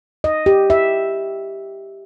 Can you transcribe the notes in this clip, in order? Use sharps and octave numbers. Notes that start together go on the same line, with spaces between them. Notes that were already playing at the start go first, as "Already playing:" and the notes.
D#5
G4
E5